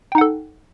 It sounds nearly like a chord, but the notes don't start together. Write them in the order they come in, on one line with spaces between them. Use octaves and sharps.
G5 D#4 F#5 A4